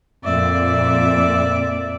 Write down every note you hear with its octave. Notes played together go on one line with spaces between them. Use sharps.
F2 A#2 D5 E5